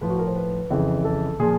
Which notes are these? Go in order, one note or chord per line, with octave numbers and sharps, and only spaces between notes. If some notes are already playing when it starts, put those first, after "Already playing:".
A2 F3 B4
F#4
A#4
C5
B4
F2 C#3 E3
A4
A#2 F3 G#4